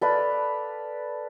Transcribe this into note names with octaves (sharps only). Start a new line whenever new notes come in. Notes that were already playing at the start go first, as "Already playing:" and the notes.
A4 B4 D5 F5